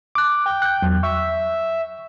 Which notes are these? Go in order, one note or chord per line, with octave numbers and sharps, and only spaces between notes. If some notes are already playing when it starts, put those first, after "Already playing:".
D6 F#6
G5
F#6 G6
E2 F#3
E5 C#6